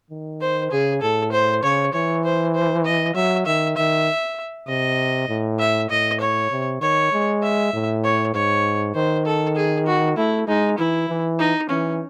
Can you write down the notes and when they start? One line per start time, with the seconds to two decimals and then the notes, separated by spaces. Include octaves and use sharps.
0.10 D#3
0.41 C5
0.71 C#3 G#4
1.01 A2 A4
1.32 C5
1.63 C#3 C#5
1.93 E3 C#5
2.24 C5
2.55 C5
2.85 D#5
3.15 F#3 E5
3.46 D#3 E5
3.77 D#3 E5
4.68 C3 D#5
5.29 A2
5.59 E5
5.90 A2 D#5
6.21 C#5
6.51 C3
6.81 D#3 C#5
7.12 G#3
7.43 E5
7.73 A2
8.04 C#5
8.34 G#2 C#5
8.95 D#3 C5
9.26 A4
9.56 G#4
9.87 F#4
10.17 A3 E4
10.48 G#3 D#4
10.78 E3 E4
11.09 E3
11.39 D#4
11.69 E3 C#4